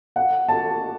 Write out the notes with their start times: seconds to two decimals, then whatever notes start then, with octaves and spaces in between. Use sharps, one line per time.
0.16 F#5
0.48 A5